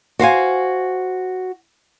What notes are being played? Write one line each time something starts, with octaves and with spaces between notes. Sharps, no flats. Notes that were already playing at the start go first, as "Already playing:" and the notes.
F#4 C5 F5 G#5